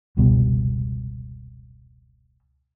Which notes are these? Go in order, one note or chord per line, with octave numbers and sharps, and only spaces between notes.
F1 C#2 B2 G3